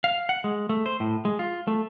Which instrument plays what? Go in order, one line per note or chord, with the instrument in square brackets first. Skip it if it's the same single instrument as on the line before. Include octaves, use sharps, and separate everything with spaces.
[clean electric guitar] F5
F#5
G#3
A3
C5
A2
G#3
F4
A3